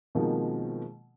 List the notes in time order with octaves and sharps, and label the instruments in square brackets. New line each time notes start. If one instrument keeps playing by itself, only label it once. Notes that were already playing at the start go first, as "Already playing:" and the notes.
[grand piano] B2 D#3 F3 G#3 A#3 C4